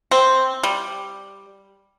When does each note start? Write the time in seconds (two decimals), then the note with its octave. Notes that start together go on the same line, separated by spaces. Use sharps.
0.11 C4
0.63 G3